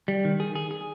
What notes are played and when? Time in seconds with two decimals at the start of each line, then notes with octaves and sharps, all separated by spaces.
0.08 G3
0.25 D#3
0.40 G#4
0.55 G#4
0.71 G#4